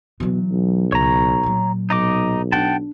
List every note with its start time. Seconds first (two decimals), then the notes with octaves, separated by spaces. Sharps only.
0.20 B2 E3 F#3
0.51 B1
0.92 C#2 C#5 A#5
1.43 A#2 F#3
1.90 B1 D#4 D#5 D6
2.52 D4 F#5 G5 A5